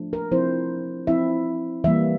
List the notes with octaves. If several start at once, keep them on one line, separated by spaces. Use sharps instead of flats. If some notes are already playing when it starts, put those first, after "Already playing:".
Already playing: F3 A3 D4
A#4
F3 C4 E4 C5
F3 C4 E4 E5
E3 G3 A#3 E5